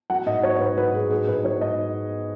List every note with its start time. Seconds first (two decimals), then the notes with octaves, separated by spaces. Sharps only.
0.10 F#3 F#5
0.26 G#2 D#5
0.43 F#3 C#5
0.55 C#5
0.60 G#2 B4
0.77 F#3 B4
0.94 G#2 G#4
1.11 F#3 G#4
1.28 G#2 B4
1.45 F#3 C#5
1.61 G#2 D#5